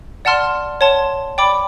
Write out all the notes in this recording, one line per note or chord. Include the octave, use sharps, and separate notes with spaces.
D5 F#5 A5 C6 F6
C#5 F#5 A5 C6
D5 G5 B5 D6